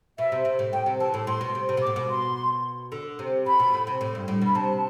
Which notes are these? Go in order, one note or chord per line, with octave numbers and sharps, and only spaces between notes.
B2 E5
C3
C3
A2
A2 G5
C3
E3 A5
A2
A2 C6
B2
C3
C3
B2
D6
A2
B2
C6
D3
C3
C3 B5
B2
A2
C3
A2
G2
A2
B2 B5
C3 A5